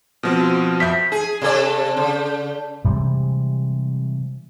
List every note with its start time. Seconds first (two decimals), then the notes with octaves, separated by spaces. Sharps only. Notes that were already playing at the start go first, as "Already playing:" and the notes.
0.23 B2 F3 C4
0.40 F#4
0.80 F2 E5 G6 B6
1.12 G#4
1.42 C3 A4 D5
1.97 C#3
2.85 C3 E3 G3 G#3